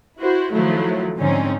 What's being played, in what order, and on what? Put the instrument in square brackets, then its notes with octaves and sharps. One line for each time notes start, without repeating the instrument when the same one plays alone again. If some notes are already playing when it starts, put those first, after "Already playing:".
[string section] E4 F#4 C5
D#3 F3 F#3 A3 E4
G#2 D3 F3 C4 C#4 D#4